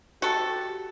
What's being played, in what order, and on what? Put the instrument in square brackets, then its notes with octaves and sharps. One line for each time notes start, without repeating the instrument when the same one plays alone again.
[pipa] F#4 A4 [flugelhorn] G4